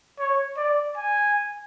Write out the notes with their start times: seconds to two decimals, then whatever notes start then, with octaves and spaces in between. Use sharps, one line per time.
0.19 C#5
0.57 D5
0.97 G#5